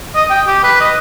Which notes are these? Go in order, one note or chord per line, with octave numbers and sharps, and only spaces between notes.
D#5
G5
G4
B4
D#5